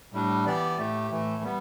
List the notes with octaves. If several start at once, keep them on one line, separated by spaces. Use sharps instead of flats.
A2 G3 D4
E3 B3 G4 D5
A2 A3 G4
A2 E3 A3
G3 B3